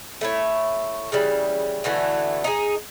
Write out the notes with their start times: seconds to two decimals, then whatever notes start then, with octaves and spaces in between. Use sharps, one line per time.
0.21 A3 E4 C#5
1.12 C#3 E3 G3
1.84 B2 D3 E3 A3
2.44 D#4 F4 G#4